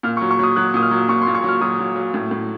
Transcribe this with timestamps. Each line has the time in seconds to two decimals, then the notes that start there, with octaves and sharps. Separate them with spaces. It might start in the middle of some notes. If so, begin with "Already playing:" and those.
0.03 A#2 F6
0.17 C#6
0.21 F#3
0.31 C#6
0.39 F#3 D#6
0.56 F#3 F#6
0.74 A#2 D#6
0.83 F6
0.91 F#3
1.09 A#2 C#6
1.22 C6
1.27 A#2
1.35 C#6
1.44 F#3 F6
1.61 F#3 D#6
1.79 F#3
1.96 F#3
2.14 A2
2.31 A2